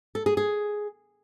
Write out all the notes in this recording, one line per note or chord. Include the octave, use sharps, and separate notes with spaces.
A4
G#4
G#4